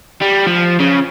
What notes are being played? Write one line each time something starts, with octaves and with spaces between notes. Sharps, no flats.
G3
F3
C#3